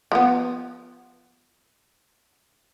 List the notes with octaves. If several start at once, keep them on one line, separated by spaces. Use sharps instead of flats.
F3 B3